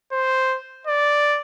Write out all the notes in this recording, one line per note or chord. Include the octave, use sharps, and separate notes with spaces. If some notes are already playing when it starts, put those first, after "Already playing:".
C5
D5